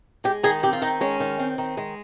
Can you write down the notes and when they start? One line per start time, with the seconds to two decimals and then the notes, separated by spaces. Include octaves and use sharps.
0.24 G#3 G4
0.43 D#3 G#4
0.63 C4 G4
0.73 F4
0.82 D#3 D#4
1.01 G#3 C#4
1.20 D#3
1.39 C4
1.58 D#3
1.77 G#3